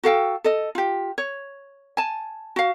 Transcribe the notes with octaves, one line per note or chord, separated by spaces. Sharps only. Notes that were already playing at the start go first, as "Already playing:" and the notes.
F#4 A4 F5 G5
A4 D#5
F4 G4
C#5
G#5 A5
F#4 F5